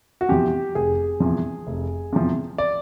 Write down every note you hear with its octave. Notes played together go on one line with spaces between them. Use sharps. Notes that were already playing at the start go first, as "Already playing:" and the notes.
F#4
E2 C3 F3 G4
F1 G#4
E2 C3 F3
F1
E2 C3 F3
D5